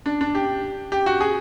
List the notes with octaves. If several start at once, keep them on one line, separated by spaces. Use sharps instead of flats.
D4
D4
G4
G4
F#4
G#4